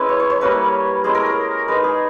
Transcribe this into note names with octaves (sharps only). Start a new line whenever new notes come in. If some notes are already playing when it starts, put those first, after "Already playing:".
Already playing: G#3 C#4 E4 B4
C#5
C#5
C#5
G3 A#3 C#4 E4 B4
G#3 C#4 E4 G#4
A#4
A#4
G#3 D#4 B4
G#4